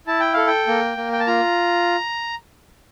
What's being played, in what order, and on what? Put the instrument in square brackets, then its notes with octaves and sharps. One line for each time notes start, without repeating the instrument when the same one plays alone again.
[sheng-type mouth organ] E4 A5
G5
A4 F5
G5
A#3
A#3
G5
A5
F4 A#5